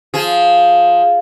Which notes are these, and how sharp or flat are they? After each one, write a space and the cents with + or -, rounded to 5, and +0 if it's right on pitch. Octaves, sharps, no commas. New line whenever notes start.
F3 +0 G#4 +0